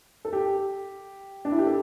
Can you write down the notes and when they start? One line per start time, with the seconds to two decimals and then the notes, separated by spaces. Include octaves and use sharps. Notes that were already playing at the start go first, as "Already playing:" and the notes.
0.25 A4
0.33 G4
1.45 D4
1.52 E4
1.59 G4
1.66 A4